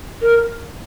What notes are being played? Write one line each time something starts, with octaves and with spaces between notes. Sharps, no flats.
A#4